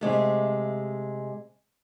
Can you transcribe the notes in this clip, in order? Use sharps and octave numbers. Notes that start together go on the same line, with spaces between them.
C3 G#3 A3